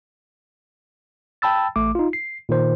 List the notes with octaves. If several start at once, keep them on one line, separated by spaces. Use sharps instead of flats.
G5 A5 B5 E6 A6
A1 A3 D6
D#4 F4
C7
A#2 D#3 C5